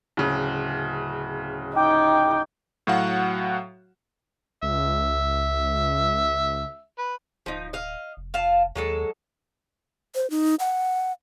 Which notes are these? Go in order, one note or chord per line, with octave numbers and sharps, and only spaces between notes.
D1 C#3
D#4 G5 D6
A2 F#3 F#4 F5 F#5
C#2 E5
B4
D1 F3 D#4
D#5 F5
F1
F4 F5 A5
D#2 F#3 G#3 A4
C5
D#4
F#5